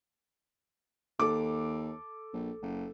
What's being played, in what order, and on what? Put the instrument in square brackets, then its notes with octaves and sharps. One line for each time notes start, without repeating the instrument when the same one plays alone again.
[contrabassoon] D#2 [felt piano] A4 D6
[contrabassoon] A#1
F#1